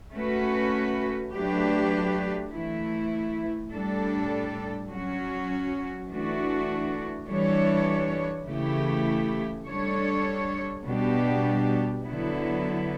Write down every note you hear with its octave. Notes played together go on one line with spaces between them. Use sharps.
A3 C#4 F#4 B4
F#3 A3 D4 G4 B4
E3 A3 E4
A2 G3 D4 A4
F#3 C#4 F#4
E3 A3 D4 F#4
E3 G3 D4 A4 C#5
C#3 E3 A3 E4 G4
G3 D4 A4 C#5
B2 G3 B3 D4 G4
D3 F#3 B3 E4